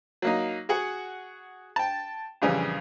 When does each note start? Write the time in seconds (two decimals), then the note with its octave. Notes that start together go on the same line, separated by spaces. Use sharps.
0.22 F#3 A#3 D#4
0.69 F#4 G#4 F#5
1.76 G5 A5
2.42 A#1 F2 C#3 E3 G3